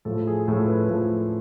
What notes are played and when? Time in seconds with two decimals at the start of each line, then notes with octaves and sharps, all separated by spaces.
0.05 A2 F3 A4
0.27 G#4
0.48 A2 F3 A4
0.68 B4
0.89 A2 F3 A4